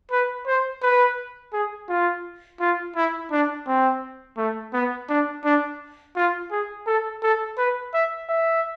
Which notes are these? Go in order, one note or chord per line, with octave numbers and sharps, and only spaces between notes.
B4
C5
B4
G#4
F4
F4
E4
D4
C4
A3
B3
D4
D4
F4
G#4
A4
A4
B4
E5
E5